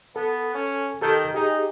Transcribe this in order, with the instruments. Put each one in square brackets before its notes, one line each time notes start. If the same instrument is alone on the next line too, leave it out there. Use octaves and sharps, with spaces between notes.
[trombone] B3 [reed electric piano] A4
[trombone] C#4
[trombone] D#3 [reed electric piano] G4 A4 G6
[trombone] D#4 [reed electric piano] G4 G#4